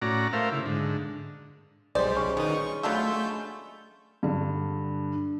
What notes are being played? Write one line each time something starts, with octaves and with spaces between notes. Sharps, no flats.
A2 C#4 F#4 D5 A#5
A3 A#4 C5 E5 F5
C#3 E4
G#2 D3
B1 G3 G#3 C5 D5
C#4
B2 D#3 D#4
C#6
F#3 A3 D4 F4 B5 E6 G6
G2 D3